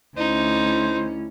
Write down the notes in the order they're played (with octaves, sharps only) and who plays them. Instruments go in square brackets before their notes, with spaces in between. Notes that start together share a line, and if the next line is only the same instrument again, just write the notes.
[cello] D2 C#4 [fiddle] D#4 [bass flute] E4 [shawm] C5